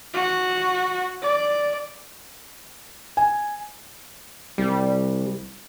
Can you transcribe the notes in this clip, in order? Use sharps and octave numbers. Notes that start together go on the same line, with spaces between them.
F#4
D5
G#5
C2 G3